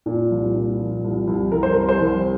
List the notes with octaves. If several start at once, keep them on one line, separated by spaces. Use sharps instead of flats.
A#2
C2
A#2
F3
C2
C2
C2 A#4
C5
C2 A#4
C5
C2